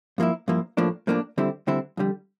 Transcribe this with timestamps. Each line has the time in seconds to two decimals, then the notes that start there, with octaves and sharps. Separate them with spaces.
0.18 G2 F3 A#3 E4
0.48 G2 F3 A#3 E4
0.77 A2 F3 A#3 D4
1.07 A2 F3 A#3 D4
1.38 D2 D3 G3 C4 E4
1.67 D2 D3 G3 C4 E4
1.97 F2 D3 G3